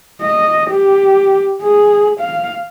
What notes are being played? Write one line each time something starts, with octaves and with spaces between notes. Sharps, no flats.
D#5
G4
G#4
F5